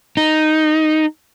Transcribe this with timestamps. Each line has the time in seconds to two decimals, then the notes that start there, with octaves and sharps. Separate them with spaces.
0.17 D#4